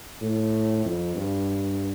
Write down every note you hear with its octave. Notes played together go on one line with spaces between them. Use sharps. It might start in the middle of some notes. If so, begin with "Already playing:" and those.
A2
F2
G2